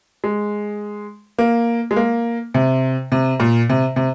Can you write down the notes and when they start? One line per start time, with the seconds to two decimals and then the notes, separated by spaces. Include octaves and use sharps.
0.24 G#3
1.39 A#3
1.91 G#3
1.96 A#3
2.54 C3
3.12 C3
3.40 A#2
3.70 C3
3.96 C3